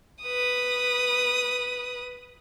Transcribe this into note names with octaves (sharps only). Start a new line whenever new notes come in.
B4 D#6